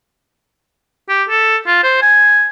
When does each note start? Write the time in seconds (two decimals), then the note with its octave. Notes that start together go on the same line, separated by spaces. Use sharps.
1.09 G4
1.29 A4
1.67 F4
1.83 C5
2.02 G#5